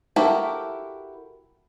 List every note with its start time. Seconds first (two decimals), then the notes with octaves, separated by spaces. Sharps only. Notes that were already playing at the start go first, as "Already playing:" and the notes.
0.16 E4 F#4 G4 A4 A#4